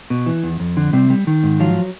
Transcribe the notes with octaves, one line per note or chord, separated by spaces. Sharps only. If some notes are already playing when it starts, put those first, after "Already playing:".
B2
E3
E2
F2
D3
C3 G3 C4
G3
D#3
G#2
F3 F#3 F4